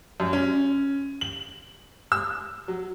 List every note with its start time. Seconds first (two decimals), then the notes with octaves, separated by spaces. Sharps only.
0.20 F#2
0.33 C#4
1.21 F#7
2.12 E6
2.68 F#3